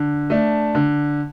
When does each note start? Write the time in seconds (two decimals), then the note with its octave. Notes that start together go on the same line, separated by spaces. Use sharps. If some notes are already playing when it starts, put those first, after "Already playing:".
Already playing: D3
0.30 A3 D4
0.75 D3